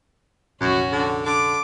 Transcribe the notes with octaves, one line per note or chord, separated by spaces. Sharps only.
F1 A#1 F#2 C#4 F#4
D3
D3 D6